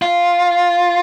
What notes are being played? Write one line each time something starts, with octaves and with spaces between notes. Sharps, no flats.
F4